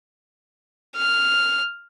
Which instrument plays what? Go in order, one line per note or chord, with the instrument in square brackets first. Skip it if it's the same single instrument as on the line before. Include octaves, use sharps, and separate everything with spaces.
[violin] F6